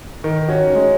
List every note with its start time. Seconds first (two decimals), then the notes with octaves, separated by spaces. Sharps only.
0.24 D#3
0.49 C#4 F#4
0.75 G#3 C#4